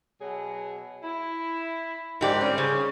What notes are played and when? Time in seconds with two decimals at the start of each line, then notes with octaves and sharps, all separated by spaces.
0.21 B2 F#3 G#4
1.03 E4
2.21 G#2 D#3 F3 G4 D5
2.41 G3 C4 C#4
2.58 C#3